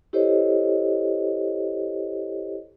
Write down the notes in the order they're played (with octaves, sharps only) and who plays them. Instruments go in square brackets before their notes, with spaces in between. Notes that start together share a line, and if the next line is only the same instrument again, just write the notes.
[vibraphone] E4 G4 A4 C5 C#5 D#5